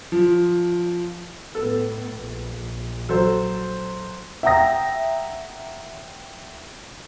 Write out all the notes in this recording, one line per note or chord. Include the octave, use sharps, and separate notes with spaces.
F3
A2 B3 A4
A#1
F#3 A4 C5
E5 F#5 G5 A#5 D#6 A#6